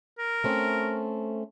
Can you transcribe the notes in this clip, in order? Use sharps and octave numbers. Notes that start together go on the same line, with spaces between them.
A#4
A3 C4 C#4